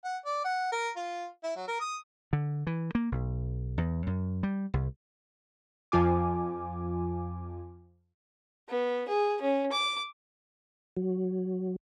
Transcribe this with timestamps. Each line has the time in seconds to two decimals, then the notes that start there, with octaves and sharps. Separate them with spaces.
0.04 F#5
0.25 D5
0.44 F#5
0.72 A#4
0.96 F4
1.43 E4
1.56 F#3
1.67 A#4
1.80 D#6
2.33 D3
2.67 E3
2.95 A#3
3.12 B1
3.78 E2
4.07 F#2
4.43 G3
4.74 C2
5.92 F2 F3 F4 G#5 D6
8.69 B3
9.08 G#4
9.41 C#4
9.72 D6
10.97 F#3